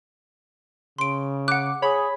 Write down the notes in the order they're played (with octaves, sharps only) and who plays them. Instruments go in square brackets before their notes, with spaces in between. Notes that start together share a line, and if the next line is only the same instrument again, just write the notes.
[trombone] C#3 [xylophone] C6 D7
[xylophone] F#5 F#6 [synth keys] D6
[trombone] G#4 [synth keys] C#5 B5